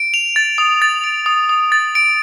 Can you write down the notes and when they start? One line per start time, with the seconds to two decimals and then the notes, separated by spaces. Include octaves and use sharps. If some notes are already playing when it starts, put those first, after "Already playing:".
Already playing: D7
0.14 F7
0.36 A6
0.58 D#6
0.82 A6
1.04 D7
1.26 D#6
1.49 D#6
1.72 A6
1.95 D7